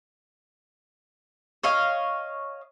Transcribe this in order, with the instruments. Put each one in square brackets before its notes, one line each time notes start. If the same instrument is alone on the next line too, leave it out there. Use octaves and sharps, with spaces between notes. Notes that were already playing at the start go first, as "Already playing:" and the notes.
[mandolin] C#5 D#5 F5